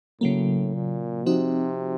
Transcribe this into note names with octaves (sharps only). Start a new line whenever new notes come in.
A2 C#3 F#3 A#3
A#2
C3 F3 C4 D#4 F#4